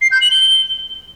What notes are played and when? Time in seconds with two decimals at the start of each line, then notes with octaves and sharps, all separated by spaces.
0.02 C7
0.11 G6
0.21 F#7
0.31 G7